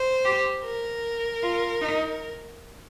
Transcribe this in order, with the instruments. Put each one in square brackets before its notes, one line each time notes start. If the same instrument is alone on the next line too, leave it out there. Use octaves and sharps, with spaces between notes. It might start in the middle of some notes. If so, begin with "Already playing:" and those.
Already playing: [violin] C5
[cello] G4
[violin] A#4
[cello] F4
D#4